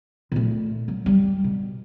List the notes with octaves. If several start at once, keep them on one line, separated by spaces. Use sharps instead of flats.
A#2 A3
F#3
G3
B2